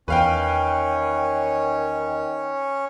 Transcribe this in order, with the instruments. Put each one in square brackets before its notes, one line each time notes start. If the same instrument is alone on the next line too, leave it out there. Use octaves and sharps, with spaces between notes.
[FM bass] E2 [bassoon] D#3 [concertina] C#4 C#5 [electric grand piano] B4 F5 G5